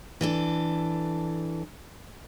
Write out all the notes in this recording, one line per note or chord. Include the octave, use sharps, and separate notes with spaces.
E3 D4 A4